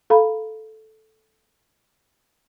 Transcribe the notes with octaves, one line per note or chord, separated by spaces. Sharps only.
A4 F5 A#5 B5